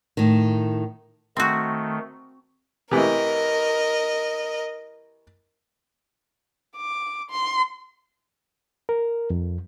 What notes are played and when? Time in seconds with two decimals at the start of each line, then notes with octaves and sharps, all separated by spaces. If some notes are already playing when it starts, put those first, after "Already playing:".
0.17 A2 D#3
1.37 D#3 A3 C4 F#4
2.91 C3 E3 A3 A#4 D#5
6.77 D6
7.30 C6
8.89 A#4
9.30 F2